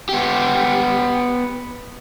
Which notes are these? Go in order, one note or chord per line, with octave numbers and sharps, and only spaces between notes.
B3 G4